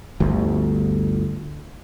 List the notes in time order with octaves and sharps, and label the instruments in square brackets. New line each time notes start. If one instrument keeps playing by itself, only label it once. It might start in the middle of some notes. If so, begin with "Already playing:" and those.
[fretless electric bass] G1 D2